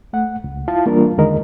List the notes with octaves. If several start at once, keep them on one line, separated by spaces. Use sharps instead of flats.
A3 F#5
C#2
E4 F4 F5 A5
E3 G3 A#3 D4 F4 A#4
E2 D3 D#3 G#3 A#4 D#5